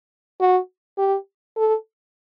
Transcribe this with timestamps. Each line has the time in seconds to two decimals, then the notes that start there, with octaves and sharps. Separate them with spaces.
0.40 F#4
0.98 G4
1.57 A4